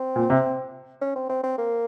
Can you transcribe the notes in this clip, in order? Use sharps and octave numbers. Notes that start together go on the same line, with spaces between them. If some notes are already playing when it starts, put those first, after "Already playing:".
Already playing: C4
A#2
C3
C#4
C4
C4
C4
A#3